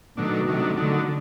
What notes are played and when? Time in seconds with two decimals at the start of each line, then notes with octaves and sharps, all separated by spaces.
0.17 B2 D#3 F#3 A3 D4
0.47 C3 D#3 F#3 A3 D4
0.77 D3 D#3 F#3 A3 D4